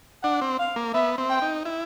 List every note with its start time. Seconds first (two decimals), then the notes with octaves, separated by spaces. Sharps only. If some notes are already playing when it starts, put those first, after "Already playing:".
0.23 D4 F#5
0.41 C4
0.60 F5
0.76 A#3
0.94 B3 E5
1.18 C4
1.30 G5
1.42 D#4
1.65 E4